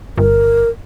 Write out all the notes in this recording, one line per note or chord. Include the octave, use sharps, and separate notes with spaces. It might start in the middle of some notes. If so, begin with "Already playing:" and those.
G1 A#4